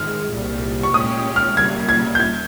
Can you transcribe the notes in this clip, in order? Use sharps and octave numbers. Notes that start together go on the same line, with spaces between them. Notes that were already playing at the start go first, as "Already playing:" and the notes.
Already playing: G#2 D#3 G#3 F6
C2 A#2 G3
C#6
A#2 G#3 C#4 G4 D#6
F6
C#3 G3 A#3 G#6
G#6
G6
G#6